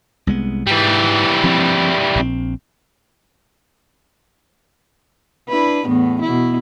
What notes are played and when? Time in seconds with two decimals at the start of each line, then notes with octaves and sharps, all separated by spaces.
0.27 C2 G#3 B3
0.67 G#2 E3 G3
1.44 F3 C4
2.15 A#1 C4
5.49 D4 E4 B4
5.86 E2 A2 B3
6.21 B2 E4